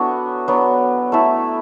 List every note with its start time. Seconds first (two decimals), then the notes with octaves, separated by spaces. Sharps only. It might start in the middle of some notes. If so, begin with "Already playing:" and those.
Already playing: F#3 B3 D4 E4 F#4 A4
0.48 F#3 B3 D4
1.12 A3 E4 A4 E5